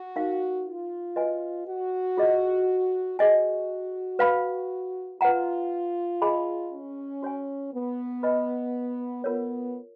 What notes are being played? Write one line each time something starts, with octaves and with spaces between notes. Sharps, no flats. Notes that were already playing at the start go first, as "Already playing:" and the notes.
Already playing: F#4
D#4 A#4 F5
F4
F#4 B4 D#5 G#5
F#4
F4 G#4 D#5
F#4 G#4 D#5 G#5
B4 F5 B5
F4 B4 F#5 A#5
G#4 D#5 G#5 B5
C#4
F#4 C#5 G#5
B3
B4 D#5 G#5 B5
B3 F4 A#4 C#5